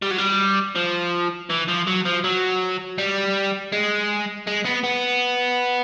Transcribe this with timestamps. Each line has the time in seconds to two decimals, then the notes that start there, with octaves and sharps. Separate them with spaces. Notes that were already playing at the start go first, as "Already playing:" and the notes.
0.02 G3
0.11 F#3
0.18 G3
0.75 F3
1.50 E3
1.69 F3
1.87 F#3
2.06 F3
2.24 F#3
2.98 G3
3.72 G#3
4.47 G#3
4.65 B3
4.84 B3